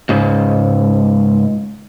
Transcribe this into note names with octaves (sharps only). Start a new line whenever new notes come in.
C#2 G#2